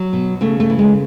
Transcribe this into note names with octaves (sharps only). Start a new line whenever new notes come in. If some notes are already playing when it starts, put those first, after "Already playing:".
Already playing: F#3
B2
C#3 A3
A3
E3
G#3